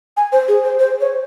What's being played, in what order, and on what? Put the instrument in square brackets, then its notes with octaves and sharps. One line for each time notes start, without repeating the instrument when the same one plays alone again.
[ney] G#5
C5
G#4
C5
C5
C#5